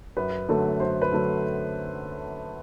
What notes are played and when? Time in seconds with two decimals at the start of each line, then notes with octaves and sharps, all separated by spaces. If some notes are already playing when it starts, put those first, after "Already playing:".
0.17 F#2 B4
0.49 D3 F#3 A3
0.80 F#2 C5
1.02 B4
1.12 D3 F#3 A3